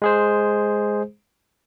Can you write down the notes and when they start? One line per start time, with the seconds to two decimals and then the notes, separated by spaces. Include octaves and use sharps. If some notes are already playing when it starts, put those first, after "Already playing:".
0.02 G#3 G#4 C5